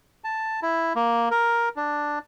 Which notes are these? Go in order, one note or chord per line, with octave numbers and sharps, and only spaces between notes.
A5
E4
A#3
A#4
D4